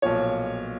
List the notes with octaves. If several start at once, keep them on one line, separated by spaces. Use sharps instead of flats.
B1 A#2 F3 C#5